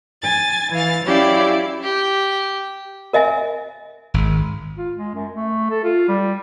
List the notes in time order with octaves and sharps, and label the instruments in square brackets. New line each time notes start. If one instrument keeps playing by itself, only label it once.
[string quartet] G#5 A6
E3 F5 A6
F#3 C#4 E4 G4 D5 F5
[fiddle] G4
[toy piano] A#4 D#5 E5 G#5
[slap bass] G#1
[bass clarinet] F4
G#3
F#2
A3
A4
F4
G3